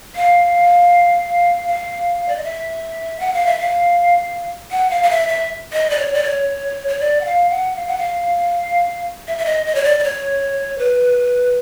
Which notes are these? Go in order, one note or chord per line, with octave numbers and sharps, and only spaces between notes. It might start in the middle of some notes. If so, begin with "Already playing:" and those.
F5
F5
D5
D#5
E5
F#5
F5
E5
F5
F#5
F5
F5
E5
E5
D#5
D5
C#5
D5
C#5
C#5
D5
F#5
F5
F#5
F5
F#5
F5
E5
E5
D#5
D#5
C#5
D5
D5
C#5
B4